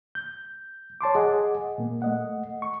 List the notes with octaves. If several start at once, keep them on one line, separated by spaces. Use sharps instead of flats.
G6
C#5 A5 C6 D6
G#4 D#5 F#5 G#5
A#2 A#3
A3 D#5 F#5
C#6